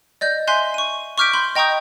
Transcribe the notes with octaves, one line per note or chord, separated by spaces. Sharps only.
D5 D#5 G6
E5 G#5 C6 F#6 G6 C7
C#6 D#7
C#6 D6 F6 G6 B6 D7
B5 C6 G6
D#5 G5 A#5 C#6 D#6 G6